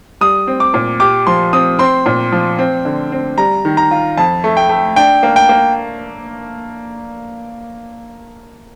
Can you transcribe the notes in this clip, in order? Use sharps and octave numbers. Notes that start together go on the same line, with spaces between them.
G3 D#6
C4
D6
A#2
G4 D6
F3 C6
C4 D#6
C4 C6
A#2
F3
C4
D3
C4
G3 A#5
D#3
A#5
F4
F2 A5
A3
G5
A3
D4 G5
A#3
G5
A#3